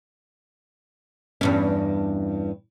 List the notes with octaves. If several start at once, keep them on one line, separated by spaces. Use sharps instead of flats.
E2 G2 C#4